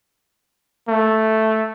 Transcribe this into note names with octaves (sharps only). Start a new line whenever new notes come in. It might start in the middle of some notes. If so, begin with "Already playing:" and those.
A3